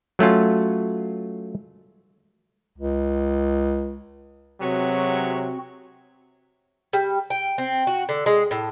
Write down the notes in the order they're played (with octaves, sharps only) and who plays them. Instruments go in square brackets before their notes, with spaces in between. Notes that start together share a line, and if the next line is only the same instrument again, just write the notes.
[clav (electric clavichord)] F#3 A3 C#4 F4
[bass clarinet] C#2
[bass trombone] C3 [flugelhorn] F#3 [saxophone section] G#3 B3 C#5 [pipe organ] C4 F#4
[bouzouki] G3
G5
C4
F#4
D3
G#3
A2